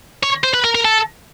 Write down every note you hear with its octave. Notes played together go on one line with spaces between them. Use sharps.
C#5
C5
B4
A#4
A#4
A4